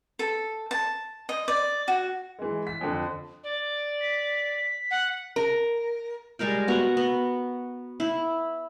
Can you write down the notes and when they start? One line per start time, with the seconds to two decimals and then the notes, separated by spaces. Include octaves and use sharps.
0.19 A4
0.71 A5
1.29 D#5
1.48 D5
1.88 F#4
2.39 E3 G#3
2.67 B6
2.81 F2 D3
3.44 D5
4.00 B6
4.91 F#5
5.36 A#4
6.39 G3 G#3 A#4 G5
6.68 B3 F#4 A#5
6.97 B3
8.00 E4